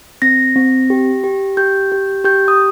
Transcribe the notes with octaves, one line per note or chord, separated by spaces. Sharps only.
C4 A#6
C4
G4
G4
G4 G6
G4
G4 G6
D#6